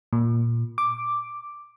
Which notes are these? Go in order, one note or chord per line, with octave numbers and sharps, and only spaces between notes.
A#2
D6